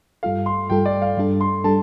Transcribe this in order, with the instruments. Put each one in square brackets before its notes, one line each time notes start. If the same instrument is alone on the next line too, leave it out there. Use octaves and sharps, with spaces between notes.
[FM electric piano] G2 G3 F4 A4 [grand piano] F5
[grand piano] C6
[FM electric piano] G2 G3 F4 A4 [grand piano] G5
[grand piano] D5
F5
[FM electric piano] G2 G3 D4 A4
[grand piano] C6
[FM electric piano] G3 D4 A4 [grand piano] A5